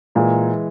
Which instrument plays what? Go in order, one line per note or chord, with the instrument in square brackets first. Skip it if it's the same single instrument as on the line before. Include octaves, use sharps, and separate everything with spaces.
[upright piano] A#2 [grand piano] E3 G#3